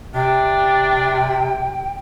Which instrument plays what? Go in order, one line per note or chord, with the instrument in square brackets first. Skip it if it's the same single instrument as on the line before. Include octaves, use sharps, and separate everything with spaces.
[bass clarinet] C3 [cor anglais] D4 [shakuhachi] G5